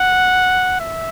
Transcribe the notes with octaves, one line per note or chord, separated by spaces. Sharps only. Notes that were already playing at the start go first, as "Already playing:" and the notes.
Already playing: F#5
E5